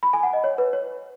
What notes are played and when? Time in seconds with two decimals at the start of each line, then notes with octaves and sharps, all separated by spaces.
0.03 B5
0.13 G#5
0.23 F#5
0.33 D#5
0.44 C#5
0.58 B4
0.73 C#5